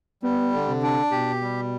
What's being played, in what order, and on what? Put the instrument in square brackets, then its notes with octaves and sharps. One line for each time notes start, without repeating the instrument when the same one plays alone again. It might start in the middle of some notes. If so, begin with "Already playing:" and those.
[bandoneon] G3 [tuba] B3
[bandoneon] D3
[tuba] C3
[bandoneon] D4
[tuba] B2 [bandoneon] G4
[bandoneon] G3